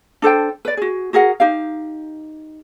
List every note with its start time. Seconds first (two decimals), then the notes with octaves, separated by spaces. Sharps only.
0.22 D4 A4 C5 G5
0.65 B4 D5
0.77 F#4 G#4
1.13 F#4 G#4 A#4 F#5
1.40 D#4 G4 F5